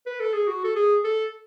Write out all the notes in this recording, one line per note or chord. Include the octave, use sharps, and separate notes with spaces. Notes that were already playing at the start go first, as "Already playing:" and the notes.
B4
A4
G#4
F#4
A4
G#4
A4